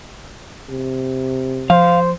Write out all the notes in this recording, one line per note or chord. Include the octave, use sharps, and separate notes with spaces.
C3
F3 C5 F5